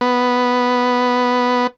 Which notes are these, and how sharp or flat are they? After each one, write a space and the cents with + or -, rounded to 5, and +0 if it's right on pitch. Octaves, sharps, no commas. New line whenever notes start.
B3 +0